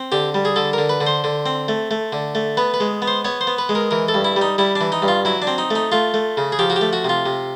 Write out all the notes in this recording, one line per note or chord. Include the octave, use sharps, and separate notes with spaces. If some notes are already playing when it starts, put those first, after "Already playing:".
Already playing: C4
D3 G4
G3
G#4
D3 A4
D3 A#4
B4
D3
C5
D3
C4
A3
A3
D3
A3
B3 B4
B4
G#3
B3
C5
B3 C#5
C5
B3
B4
G#3
A#4
E3 A#4
A4
G2
E4
G3
D#4
G3 E4
D4
E3
D#4
G2
F4
F#3 E4
D4
C4
D#4
A3 D#4
A3 F4
A3
C#3
G#4
F3 G4
F#4
G4
A3
F#4
C3 F4
C3